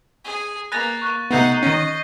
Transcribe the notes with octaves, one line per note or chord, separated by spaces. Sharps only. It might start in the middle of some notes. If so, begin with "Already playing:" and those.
G#4
A#3 B4 G#5 F#6 A6 A#6
C#6 F#6
C3 A3 B3 D#4 F#5 G6 C7 D#7
D#3 C#4 D#5